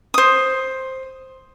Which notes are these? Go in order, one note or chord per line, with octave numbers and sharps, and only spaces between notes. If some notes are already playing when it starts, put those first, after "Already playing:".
C5 D#6